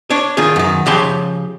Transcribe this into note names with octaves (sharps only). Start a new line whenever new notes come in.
D4 C#5
D#3 F4 G#4
F#2 D#3
C#3 F3 G4 C#5 B5 C6